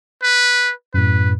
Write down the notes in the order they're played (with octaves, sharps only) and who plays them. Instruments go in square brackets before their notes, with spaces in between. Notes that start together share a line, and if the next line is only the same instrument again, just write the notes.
[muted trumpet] B4
[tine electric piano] F#2 A2 [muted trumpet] B4